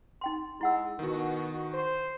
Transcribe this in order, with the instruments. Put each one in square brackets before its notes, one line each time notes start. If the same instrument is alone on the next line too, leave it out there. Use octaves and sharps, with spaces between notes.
[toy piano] D#4 G5 C6
[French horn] G#3 [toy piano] E4 F#5 E6
[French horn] B2 [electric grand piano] D#3 F#4
[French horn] C5